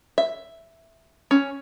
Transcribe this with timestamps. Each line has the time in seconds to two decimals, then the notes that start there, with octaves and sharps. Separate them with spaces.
0.18 E5
1.31 C#4